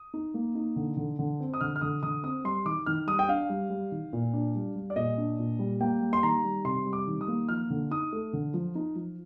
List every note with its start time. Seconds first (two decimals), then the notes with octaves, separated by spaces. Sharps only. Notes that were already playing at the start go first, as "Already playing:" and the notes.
Already playing: D#6
0.14 D#4
0.34 A#3
0.55 D#4
0.76 D3
0.97 D3
1.19 D3
1.40 C4
1.54 D#6
1.61 D3 F6
1.76 F6
1.81 D3 D#6
2.03 D3 D#6
2.23 C4 D#6
2.44 G3 C6
2.65 D#3 D6
2.86 D#3 F6
3.07 G3 D#6
3.19 G5
3.28 D4 F5
3.49 G3
3.70 G3
3.92 D#3
4.13 A#2
4.33 D4
4.55 G3
4.76 G3
4.90 D5
4.96 A#2 D#5
5.18 D4
5.39 A#2
5.59 G3
5.81 A#3 G5
6.01 G3
6.13 C6
6.23 D#3 A#5
6.44 G3
6.65 C3 C6
6.86 G3
6.93 D6
7.07 D#3
7.21 D#6
7.28 A#3
7.49 F3 F6
7.70 D3
7.91 D#4 D#6
8.12 A3
8.33 D3
8.54 F3
8.75 D#4
8.95 F3